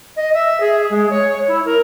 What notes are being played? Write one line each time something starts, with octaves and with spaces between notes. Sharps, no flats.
D#5
E5
G#4
G#3
C#5
E4
A#4